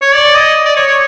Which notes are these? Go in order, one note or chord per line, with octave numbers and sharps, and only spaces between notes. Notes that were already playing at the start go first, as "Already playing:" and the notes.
C#5
D5
D#5
D5
C#5
C#5